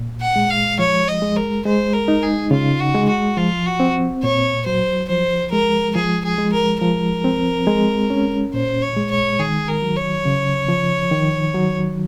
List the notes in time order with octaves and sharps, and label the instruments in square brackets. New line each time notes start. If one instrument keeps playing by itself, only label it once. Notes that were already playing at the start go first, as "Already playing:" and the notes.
Already playing: [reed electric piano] A#2
[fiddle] F#5
[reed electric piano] G#3
[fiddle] F5
[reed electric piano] F3 [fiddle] C#5
[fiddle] D#5
[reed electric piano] G#3
[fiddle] A#4
[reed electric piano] G#3 [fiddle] C5
[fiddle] A#4
[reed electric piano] D#4
[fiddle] G#4
[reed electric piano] C#3 [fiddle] F4
[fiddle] F#4
[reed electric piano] G#3
[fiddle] F#4
[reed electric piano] F3 [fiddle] F4
[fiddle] F#4
[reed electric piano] C4
[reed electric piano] A#2 [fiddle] C#5
[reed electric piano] F#3 [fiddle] C5
[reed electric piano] F3 [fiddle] C5
[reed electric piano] G#3 [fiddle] A#4
[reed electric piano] F3 [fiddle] G#4
[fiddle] G#4
[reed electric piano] G#3
[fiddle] A#4
[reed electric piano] F3 [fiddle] A#4
[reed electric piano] C4
G#3
C#4
[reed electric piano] A#2 [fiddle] C5
[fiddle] C#5
[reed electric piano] G#3
[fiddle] C#5
[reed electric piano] D#3 [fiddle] G#4
[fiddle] A#4
[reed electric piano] F#3
[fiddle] C#5
[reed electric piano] C#3
F3
D#3
F#3